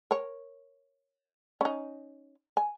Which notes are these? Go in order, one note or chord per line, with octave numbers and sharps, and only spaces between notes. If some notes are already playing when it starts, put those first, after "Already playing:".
A#4 C#5
C#4 D#4
G#5